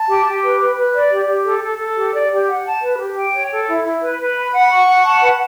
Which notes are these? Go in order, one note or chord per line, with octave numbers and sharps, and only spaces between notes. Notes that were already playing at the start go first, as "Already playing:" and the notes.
Already playing: A5
G4
G4
B4
B4
B4
D5
G4
G4
A4
A4
A4
G4
D5
G4
F#5
A5
B4
G4
G5
C#5
A4
E4
E4
B4
B4
B5
F#5
C#6
F#5
A5
B4